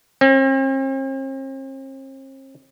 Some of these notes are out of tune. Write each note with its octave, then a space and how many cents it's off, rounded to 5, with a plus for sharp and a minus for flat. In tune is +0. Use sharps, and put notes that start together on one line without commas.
C4 +45